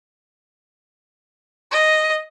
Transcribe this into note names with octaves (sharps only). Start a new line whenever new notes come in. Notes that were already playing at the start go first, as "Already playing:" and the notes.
D#5